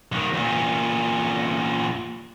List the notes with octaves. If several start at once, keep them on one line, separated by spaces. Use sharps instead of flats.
B1 D#3
E2 A#2